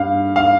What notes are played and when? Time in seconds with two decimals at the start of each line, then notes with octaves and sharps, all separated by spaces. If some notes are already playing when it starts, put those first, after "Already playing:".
Already playing: G2 F5
0.36 F5